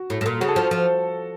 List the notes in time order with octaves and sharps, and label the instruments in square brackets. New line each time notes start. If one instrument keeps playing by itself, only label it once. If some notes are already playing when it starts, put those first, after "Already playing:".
Already playing: [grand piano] F#4
[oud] A2
A2
A#2
[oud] C#3 [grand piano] F#4
[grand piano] A4
[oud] F3 [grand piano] F#4
[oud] F3